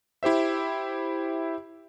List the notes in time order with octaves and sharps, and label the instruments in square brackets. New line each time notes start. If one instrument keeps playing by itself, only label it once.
[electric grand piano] E4 G4 C5 E5